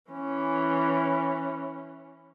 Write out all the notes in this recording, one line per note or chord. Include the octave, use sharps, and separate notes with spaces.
E3 C#4